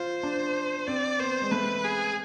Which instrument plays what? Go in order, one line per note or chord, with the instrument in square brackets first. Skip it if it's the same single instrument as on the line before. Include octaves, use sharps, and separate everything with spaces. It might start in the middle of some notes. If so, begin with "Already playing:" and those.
Already playing: [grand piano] F4 [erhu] C5
[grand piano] D4
[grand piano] C4 [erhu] D5
[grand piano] B3 [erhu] C5
[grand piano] G#3
[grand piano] A3 [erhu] B4
[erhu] G#4